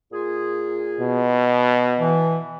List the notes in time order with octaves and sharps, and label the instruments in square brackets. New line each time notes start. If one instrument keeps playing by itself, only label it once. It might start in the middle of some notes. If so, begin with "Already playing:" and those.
[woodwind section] A#2 F4 G#4
[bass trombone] B2
[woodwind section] E3